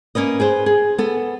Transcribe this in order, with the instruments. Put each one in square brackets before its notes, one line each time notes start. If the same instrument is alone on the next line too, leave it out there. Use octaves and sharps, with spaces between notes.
[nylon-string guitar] A#3 C#4 B4 D#5
G#4 B4 C5
G#4
B3 A4